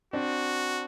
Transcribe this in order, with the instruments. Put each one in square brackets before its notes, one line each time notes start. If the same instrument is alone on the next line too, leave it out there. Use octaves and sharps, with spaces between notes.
[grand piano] C4 D4 [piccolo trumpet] F#4